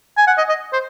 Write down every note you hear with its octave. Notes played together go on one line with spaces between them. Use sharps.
G#5
F#5
D#5
D#5
C5